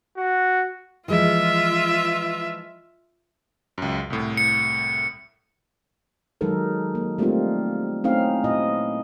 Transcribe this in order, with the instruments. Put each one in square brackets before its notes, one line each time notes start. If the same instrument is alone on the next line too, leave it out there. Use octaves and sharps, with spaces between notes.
[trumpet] F#4
[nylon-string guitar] E3 F3 G#3 [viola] F4 E5
[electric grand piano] C#2 F#2
C2 A2
[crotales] C#7
[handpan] D#3 F#3 G#3 D#4 A4 A#4
A#3
G3 A3 A#3 C4 D#4 F4
A3 C4 C#4 D#4 E4 F5
A#2 E4 D#5